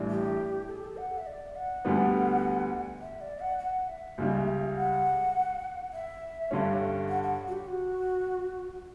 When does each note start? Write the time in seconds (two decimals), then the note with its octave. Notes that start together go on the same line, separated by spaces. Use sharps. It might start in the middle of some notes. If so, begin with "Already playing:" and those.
Already playing: A1 A2 E3 G3 D4
0.10 G4
0.68 A4
0.76 G4
0.85 A4
0.97 F#5
1.18 E5
1.27 D5
1.55 F#5
1.85 D2 D3 G3 B3
3.01 E5
3.21 D5
3.40 F#5
3.59 F#5
3.88 E5
4.18 C#2 C#3 G3
4.76 F#5
5.93 E5
6.51 G2 D3 G3 C#4
7.09 F#5
7.23 F#5
7.48 F#4
7.53 G4
7.67 F#4